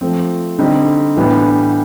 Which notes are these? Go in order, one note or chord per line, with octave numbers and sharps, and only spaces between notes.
F3 A3 C4
D3 G3 C4 D#4
A2 E3 G3 B3 D4